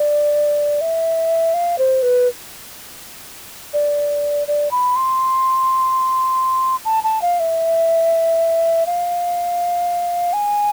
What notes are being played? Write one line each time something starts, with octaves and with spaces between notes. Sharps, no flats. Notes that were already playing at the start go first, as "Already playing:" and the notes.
Already playing: D5
E5
F5
C5
B4
D5
D5
B5
C6
A5
A5
F5
E5
F5
G#5